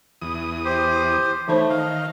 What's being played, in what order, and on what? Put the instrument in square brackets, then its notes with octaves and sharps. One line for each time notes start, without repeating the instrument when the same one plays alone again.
[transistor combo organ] E2 D#6
[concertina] G4 C5
[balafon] E3 D#4 C5 [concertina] A3
[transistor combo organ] D#3 [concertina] F5